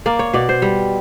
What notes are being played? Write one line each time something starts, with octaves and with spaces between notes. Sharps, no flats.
A#3 D5
C#5
B2 D5
C5
G3